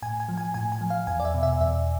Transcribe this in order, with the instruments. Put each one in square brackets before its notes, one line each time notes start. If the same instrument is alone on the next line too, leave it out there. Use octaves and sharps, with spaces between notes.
[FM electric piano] A2 G#5
G#5
F3
G#5
A2 G#5
G#5
F3
F5
E2 G#5
D5
E5
B2
E5
E2 E5